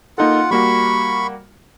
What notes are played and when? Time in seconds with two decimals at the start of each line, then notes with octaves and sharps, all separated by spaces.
0.18 A#3 D#4 F4 A4 F#5
0.51 G3 A#3 F#4 B5 C#6